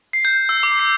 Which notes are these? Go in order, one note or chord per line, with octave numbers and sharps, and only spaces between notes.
C7
G6
E6
D6
C7